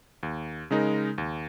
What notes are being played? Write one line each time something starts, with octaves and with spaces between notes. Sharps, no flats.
D#2
C#3 G#3 D#4 A#4
D#2